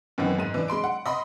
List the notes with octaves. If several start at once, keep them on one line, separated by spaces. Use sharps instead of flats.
F#2 D#3 E3 B3 C4
G#2 D#7
E3 D4
G#3 B5 C6 D7
F#5
D#5 B5 C6